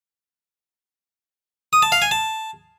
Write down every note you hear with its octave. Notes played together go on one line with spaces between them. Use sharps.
D#6
A5
F5
G#5
A5